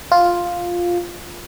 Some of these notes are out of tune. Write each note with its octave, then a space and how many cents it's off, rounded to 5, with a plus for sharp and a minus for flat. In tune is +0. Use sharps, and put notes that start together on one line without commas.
F4 +5